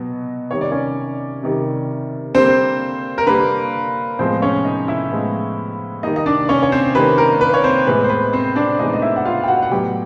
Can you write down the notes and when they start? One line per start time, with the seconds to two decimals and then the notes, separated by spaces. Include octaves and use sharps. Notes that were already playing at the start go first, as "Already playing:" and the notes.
Already playing: B2 F#3 B3
0.51 C3 D#3 G3 C#5
0.61 D5
0.72 C#4 C#5
1.43 C3 D#3 G3
2.35 D3 G3 A#3 C4 C5
3.18 A#4
3.27 D3 G3 A#3 B4
4.19 A2 F3 G#3 B3 C4 C5
4.42 C#4 C#5
4.65 D#4 D#5
4.88 E4 E5
5.11 A2 F3 G#3 B3
6.03 D#3 G3 A#3 D#4 D#5
6.16 D#5
6.26 D4 D5
6.49 C#4 C#5
6.63 C#5
6.72 C4 C5
6.95 D#3 G3 A#3 B4
7.18 A#4
7.41 B4
7.54 C#5
7.64 C4 C5
7.87 A2 E3 G#3 B3 B4
8.04 C5
8.09 B4
8.33 C4 C5
8.56 D4 D5
8.79 A2 E3 G#3 B3 D#4 D#5
8.93 D#5
9.02 E4 E5
9.16 F#5
9.25 F4 F5
9.44 G5
9.48 F#4 F#5
9.62 F#5
9.71 A2 F#3 B3 G4 G5